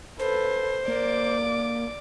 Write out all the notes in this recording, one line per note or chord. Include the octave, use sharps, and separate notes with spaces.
A4 B4 C5
A#3 D5 D6